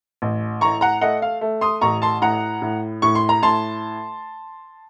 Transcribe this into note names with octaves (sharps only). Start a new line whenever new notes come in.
A1
A2 A#5 C#6
F#5 A#5
A3 D#5 F#5
F5
A3
C6 D#6
A1 A#5 C#6
A5 C6
A2 F#5 A#5
A2
A2 C#6
C6
A#5
A2 A5 C6